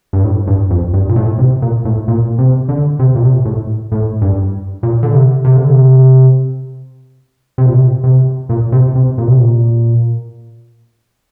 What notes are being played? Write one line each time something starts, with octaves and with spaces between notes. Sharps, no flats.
G2
A2
G2
F2
G2
A#2
A2
C3
A#2
A2
A#2
C3
D3
C3
A#2
C3
A2
A2
G2
A#2
D3
C3
C3
D3
C3
C3
A#2
C3
C3
A#2
C3
C3
A#2
C3
A#2